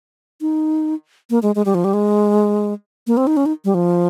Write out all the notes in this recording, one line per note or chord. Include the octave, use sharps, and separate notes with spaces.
D#4
A#3
G#3
G#3
G3
F3
G3
G#3
A#3
C4
D#4
C#4
D#4
G3
F3